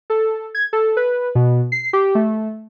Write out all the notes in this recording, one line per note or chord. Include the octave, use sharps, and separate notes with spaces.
A4
G#6
A4
B4
B2
C7
G4
A3